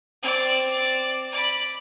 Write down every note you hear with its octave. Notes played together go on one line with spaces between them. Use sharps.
C4 D5
D5 B5